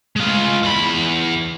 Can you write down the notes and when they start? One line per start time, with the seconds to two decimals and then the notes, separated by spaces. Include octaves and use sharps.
0.16 G#3 F4
0.63 E2 B5